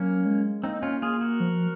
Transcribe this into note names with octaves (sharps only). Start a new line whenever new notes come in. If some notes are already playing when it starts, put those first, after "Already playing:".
Already playing: F#3 A#3 C#4
G#3
A#3 C4 D#4
C#4 F4
A#3 F4 G#4
F#4 A#4
F3